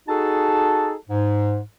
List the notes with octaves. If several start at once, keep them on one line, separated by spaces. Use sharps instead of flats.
D#4 F#4 G#4 A4 A5
G#2